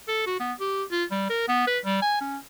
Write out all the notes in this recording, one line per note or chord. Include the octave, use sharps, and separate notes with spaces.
A4
F#4
B3
G4
F4
G3
A#4
B3
B4
G3
G#5
C#4